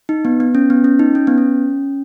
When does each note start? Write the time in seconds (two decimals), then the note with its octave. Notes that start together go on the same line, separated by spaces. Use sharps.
0.09 D#4
0.25 B3
0.40 B3
0.55 C#4
0.70 B3
0.84 C#4
0.99 D#4
1.15 C#4
1.27 B3
1.38 C#4